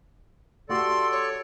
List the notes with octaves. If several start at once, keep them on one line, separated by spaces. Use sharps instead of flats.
A3 F#4 G4 A4 D5 C6
C#5